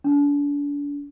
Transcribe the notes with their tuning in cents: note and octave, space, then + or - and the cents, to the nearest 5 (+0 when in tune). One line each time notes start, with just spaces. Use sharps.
D4 -35